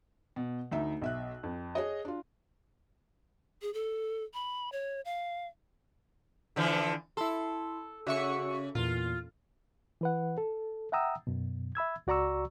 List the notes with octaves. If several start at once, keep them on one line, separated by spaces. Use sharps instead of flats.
B2
D2 D#4 E5
B1 E5 F#6
F2
G#4 C#5 D#5
D4 F4
G#4
A4
B5
C#5
F5
D3 E3 F3
E4 A4 C6
C#3 F#4 E5 C#6
E2 A#2 F4
E3 B4 F#5
A4
E5 F#5 G5 A#5 D#6 E6
F#2 B2
E5 B5 E6 G#6
C#2 F#4 D5 A#5 C#6 E6